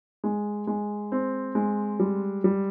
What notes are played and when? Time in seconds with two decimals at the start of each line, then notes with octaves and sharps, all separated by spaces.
0.24 G#3
0.67 G#3
1.12 C4
1.55 G#3
2.00 G3
2.44 G3